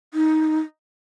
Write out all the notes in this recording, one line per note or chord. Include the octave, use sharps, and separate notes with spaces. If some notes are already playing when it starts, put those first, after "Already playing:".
D#4